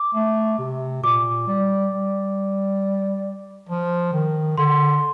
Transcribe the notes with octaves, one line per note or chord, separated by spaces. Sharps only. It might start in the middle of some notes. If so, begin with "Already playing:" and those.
Already playing: D6
A3
C3
A#2 D6
G3
G3
F3
D#3
D3 C6